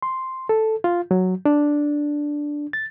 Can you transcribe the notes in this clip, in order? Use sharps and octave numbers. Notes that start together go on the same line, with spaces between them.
C6
A4
F4
F#3
D4
A6